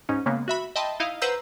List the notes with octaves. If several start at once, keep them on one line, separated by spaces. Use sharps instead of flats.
G#2 C#4 D#4
C#3 G#3 A#3 B3
F#4 E5 B5
D#5 E5 G5 A5 B5 C6
D#4 E4 D#5 F5
B4 C5 F#5 A#5 E6 G6